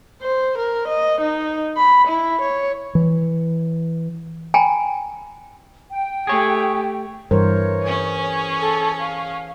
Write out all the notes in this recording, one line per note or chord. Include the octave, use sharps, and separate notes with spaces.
C5
A#4
D#5
D#4
B5
E4
C#5
E3
G5 G#5 A#5 B5
G5
A3 G4 G#4 C#5
G2 E3 A#4 C5 C#5
C#4 G#4
A4
F5